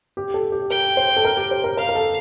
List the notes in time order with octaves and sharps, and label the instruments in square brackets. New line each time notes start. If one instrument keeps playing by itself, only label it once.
[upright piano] G4
A4
G4
[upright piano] A#4 [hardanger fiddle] G5
[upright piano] C5
A4
A#4
G4
C5
A#4
[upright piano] A#4 [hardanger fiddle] F5
[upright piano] A#4
A4